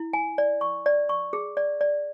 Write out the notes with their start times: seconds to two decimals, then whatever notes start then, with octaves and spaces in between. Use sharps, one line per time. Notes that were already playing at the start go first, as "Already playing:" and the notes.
Already playing: E4
0.13 G#5
0.38 D5
0.61 C#6
0.86 D5
1.09 C#6
1.33 G#4
1.57 D5
1.81 D5